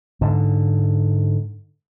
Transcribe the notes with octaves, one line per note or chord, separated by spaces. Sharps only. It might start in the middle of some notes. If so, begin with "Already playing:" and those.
G#2 D3